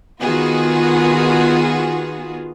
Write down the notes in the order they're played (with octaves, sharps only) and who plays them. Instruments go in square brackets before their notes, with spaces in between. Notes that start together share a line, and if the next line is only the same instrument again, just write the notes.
[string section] D#3 B3 F4 F#4 G#4